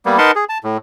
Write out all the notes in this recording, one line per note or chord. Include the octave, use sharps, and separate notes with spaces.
G3 A#3 B3
D#4 A#4 B4 F#5 A5 C6
G#4
A5
A2